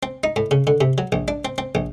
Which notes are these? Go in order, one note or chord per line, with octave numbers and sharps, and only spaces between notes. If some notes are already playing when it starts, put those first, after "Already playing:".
C4
D#4
A2
C#3
D3
C3
F#3
A#1
D4
C4
C4
A#1